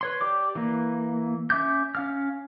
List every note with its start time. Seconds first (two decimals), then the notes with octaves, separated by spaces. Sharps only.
0.01 B4 C#5 C6
0.21 G4 D5 D6
0.55 E3 A#3
1.50 C#4 E5 D6 G6
1.95 C#4 F5 F6